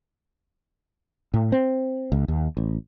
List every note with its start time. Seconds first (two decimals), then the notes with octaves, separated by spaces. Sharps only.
1.34 A2
1.52 C4
2.12 C#2
2.28 D#2
2.57 A1